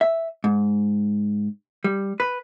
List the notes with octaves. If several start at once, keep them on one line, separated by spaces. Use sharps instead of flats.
E5
G#2
G3
B4